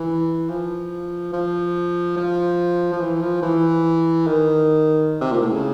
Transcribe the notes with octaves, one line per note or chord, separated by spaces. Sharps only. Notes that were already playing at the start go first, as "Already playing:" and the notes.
Already playing: E3
F3
F3
F3
F3
E3
F3
E3
D#3
C3
A#2
A2
C#3